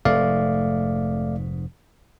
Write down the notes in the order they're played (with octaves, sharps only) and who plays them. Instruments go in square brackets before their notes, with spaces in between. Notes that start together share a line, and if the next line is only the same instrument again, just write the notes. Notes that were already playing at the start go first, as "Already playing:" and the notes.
[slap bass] F1 G#2 [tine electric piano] A3 D5 F5